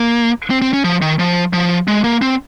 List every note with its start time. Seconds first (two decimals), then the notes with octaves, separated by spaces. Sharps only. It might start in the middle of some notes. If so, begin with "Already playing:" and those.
Already playing: A#3
0.50 C4
0.62 C4
0.73 C#4
0.84 F3
1.02 D#3
1.19 F3
1.53 F3
1.88 G#3
2.04 A#3
2.22 C4